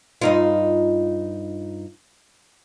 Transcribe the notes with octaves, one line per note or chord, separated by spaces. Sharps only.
G2 D#4 F4